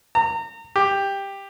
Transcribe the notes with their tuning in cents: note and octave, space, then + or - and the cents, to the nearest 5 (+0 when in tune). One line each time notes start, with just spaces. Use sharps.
A#5 -35
G4 +10